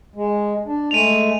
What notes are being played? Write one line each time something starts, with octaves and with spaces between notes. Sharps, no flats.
G#3
D4
G#3 A3 D#7 F7